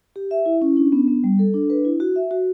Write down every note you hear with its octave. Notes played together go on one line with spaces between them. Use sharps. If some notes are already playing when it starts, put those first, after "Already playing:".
G4
E5
E4
C#4
D4
B3
B3
G3
A4
D4
B4
E4
F#4
E5
F#4